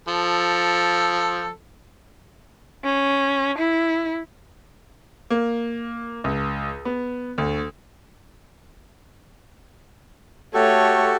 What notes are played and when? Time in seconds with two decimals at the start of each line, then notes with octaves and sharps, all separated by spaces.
0.08 F3 A4
2.84 C#4
3.58 E4
5.30 A#3
6.24 C#2
6.85 B3
7.38 D2
10.54 A3 F#4 G4 A4 C#5